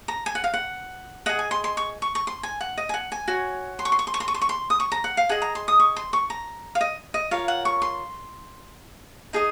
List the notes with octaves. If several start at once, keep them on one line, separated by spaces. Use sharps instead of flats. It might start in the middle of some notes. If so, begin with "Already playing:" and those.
A#5
G#5
F#5
F5
F#5
G#4 D#5 F#5
G#5
C6
C6
C#6
C#6
C#6
C6
G#5
F#5
D#5
G#5
F#5
G#5
F#4 C#5
C6
C#6
C6
C#6
C6
C#6
C6
C#6
C6
C#6
C6
D#6
C#6
A#5
F#5
F5
G#4 D#5 F#5
A#5
C6
D#6
C#6
C6
C#6
A#5
F5
D#5
D#5
F4 A#4 C#5 F5
F#5
C#6
C6
D#4 G#4 D#5